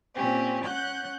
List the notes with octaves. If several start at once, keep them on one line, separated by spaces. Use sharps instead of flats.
A#2 C4 C#4 G4
C#4 F#5 F#6 G6